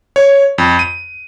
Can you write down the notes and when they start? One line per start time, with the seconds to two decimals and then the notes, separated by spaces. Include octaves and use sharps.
0.16 C#5
0.58 F2
0.79 D#7